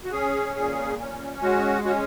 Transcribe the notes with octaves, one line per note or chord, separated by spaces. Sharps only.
F#4
C#4 G#4
A#2 G#4
C#4
G#3 F#4
C#4 F#4